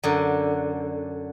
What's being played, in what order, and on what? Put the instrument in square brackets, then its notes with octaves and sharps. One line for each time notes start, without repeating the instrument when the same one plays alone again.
[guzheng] F#2 D3